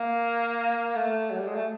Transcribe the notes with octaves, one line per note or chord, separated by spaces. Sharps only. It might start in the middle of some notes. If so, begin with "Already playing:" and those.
Already playing: A#3
A3
F#3
G3
G#3
A3